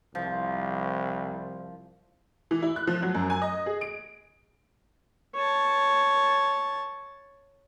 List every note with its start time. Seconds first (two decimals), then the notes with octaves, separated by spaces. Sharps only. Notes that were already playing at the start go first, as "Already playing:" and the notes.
0.15 C2 F3
2.51 E3
2.62 E4
2.76 F#6
2.87 F3
3.02 F#3
3.15 F#2
3.30 G#5
3.42 D#5
3.66 G#4
3.81 D7
5.35 C#5 A5